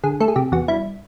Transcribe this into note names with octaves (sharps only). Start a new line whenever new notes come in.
D3 G#4
A3 A4
G#4
C3 G4
E2 F#4
G2 E4